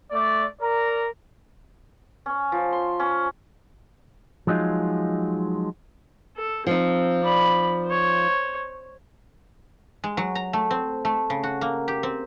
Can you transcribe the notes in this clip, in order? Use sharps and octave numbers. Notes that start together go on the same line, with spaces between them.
A3 D5
A#4 D5 A#5
C#4
F3
C6
C#4
F3 F#3 G#3 D#4 F4
A4
F3 C4 D#4
D5 B5
C5 C#5
G#3
F#3
A#5
A3
C4
A3
C#3
F#4
A#3
G4
C4